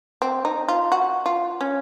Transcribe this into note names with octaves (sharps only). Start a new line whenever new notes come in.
C4
D#4
F4
F#4
F4
C#4